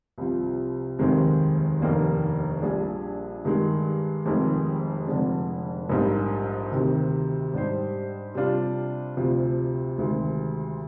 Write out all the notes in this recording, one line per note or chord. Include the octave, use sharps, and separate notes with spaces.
C2 C3 F3
F1 D#2 D#3 G#3 C4
F1 D#2 D#3 A#3 D4
A#1 A#2 G3 D4 G#4
G2 D#3 G#3
F1 F2 C3 D#3 G#3
F1 F2 D3 G#3 D4
A#1 G#2 G3 A#3
D2 C3 D#3
G#2 G3 D4 G4 C5
C3 G3 D4 F4
D2 C3 F3
D2 C3 D#3 G#3